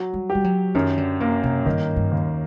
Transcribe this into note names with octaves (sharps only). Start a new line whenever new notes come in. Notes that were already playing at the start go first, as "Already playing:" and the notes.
Already playing: F#3
G3
G4
G3
F#3
F#2 D#3
D3
C3 A#3
C3
G2 D#3
G2
D#2